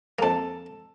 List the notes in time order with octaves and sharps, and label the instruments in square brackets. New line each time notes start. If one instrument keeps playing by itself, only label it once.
[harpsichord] F2 A#3 [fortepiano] A4 A5